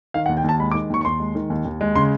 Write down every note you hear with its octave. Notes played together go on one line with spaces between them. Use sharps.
D#3 F5
F#5
D#2
G5
D#2 A5
G#3 B5
D6
D#3
D#2 C#6
C#6
D#2 C6
G#3
D#3
D#2
D#2
G#3
C#3 C6